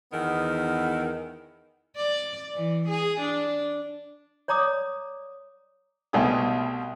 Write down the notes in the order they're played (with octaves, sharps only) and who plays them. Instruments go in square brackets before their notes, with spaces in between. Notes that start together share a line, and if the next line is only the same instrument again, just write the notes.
[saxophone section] E2 D#3 B3
[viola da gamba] D5
E3
G#4
D4
[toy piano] C#5 D5 A#5 D6 D#6
[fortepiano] C2 B2 G3 A3 G#5 D#6